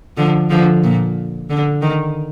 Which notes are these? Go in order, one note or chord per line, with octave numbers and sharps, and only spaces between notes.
D3 F3
D3 F3
A#2
D3
D#3